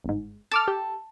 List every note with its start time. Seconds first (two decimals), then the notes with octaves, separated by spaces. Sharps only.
0.04 G1 G#2
0.51 A4 A5 D6 F6
0.68 G4